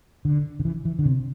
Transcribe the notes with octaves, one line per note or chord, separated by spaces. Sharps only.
D3
D3
E3
E3
D3
C3